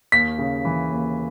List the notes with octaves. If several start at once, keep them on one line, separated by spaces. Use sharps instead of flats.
D#2 B6
C#3
E3
D#2